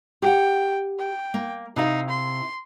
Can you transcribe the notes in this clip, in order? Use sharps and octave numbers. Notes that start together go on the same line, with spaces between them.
G4 F#5 G5
G5
A#3
C3 D#4 E4 F5
C6